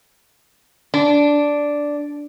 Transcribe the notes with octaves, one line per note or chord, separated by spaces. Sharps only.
D4